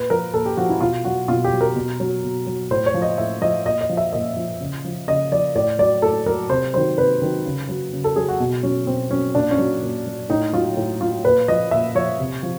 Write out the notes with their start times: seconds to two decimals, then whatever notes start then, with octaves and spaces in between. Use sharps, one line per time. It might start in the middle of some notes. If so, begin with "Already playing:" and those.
Already playing: A#2 B4
0.10 F3 A#4
0.33 A#2 A4
0.46 G4
0.57 F3 F#4
0.69 E4
0.81 B2 F4
1.05 F#3 F#4
1.28 B2 F4
1.44 G4
1.53 F#3
1.61 A#4
1.76 B2
2.00 F#3
2.24 B2
2.46 F#3
2.71 A2 C5
2.86 C#5
2.94 F3
3.02 D#5
3.18 A2 E5
3.41 F3 D#5
3.66 A#2 D#5
3.81 D#5
3.89 F3
3.97 E5
4.13 A#2 D#5
4.36 F3
4.60 C#3
4.85 F3
5.07 C#3 D#5
5.31 F3 D5
5.55 A2 D5
5.78 F#3 D5
6.02 A2 A4
6.26 F#3 A#4
6.50 C3 C5
6.74 D#3 F#3 C5
6.98 C3 B4
7.22 D#3 F#3
7.45 C#3
7.69 F#3
7.93 C#3
8.04 A4
8.16 F#3 G#4
8.29 F#4
8.40 B2
8.63 F#3 C#4
8.87 B2 C4
9.10 F#3 C#4
9.35 A#2 D4
9.51 C#4
9.58 F#3
9.83 A#2
10.06 F#3
10.29 A2 D#4
10.53 F#3 F4
10.77 A2
11.00 F#3 F4
11.24 A#2 B4
11.48 F3 D#5
11.71 A#2 E5
11.95 F3 C#5
12.19 C3
12.43 F3